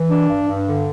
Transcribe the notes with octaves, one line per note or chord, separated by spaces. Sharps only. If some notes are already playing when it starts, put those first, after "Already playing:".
Already playing: E3
D4
G2
G2
D3